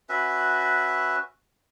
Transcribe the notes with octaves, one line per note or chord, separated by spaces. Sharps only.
C#4 F#4 B4 E5